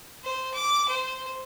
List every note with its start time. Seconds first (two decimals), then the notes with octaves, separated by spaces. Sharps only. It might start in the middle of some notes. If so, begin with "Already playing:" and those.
0.23 C5
0.54 D6
0.89 C5